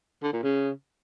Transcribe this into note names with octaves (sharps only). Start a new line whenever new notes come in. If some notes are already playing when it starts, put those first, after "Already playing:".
D3
A#2
C#3